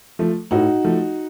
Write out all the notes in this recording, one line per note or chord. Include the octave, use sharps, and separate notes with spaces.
F3 A3
A2 D#4 F#4
F3 A3